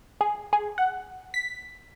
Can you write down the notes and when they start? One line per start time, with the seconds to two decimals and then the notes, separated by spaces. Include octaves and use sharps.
0.21 G#4
0.53 G#4
0.78 F#5
1.34 B6